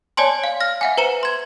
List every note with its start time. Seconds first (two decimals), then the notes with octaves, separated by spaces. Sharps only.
0.17 C#5 D5 G#5 A5 C6
0.44 F5
0.61 F6 A#6
0.81 E5 F#5 G#5
0.98 B4 C5 A#5 C#7 E7
1.23 C6 G#6